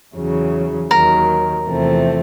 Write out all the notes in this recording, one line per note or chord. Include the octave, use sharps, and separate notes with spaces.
E2 C#3 F#3
D#2 D#3 F#3 A#4
E2 C3 F3 A3 C4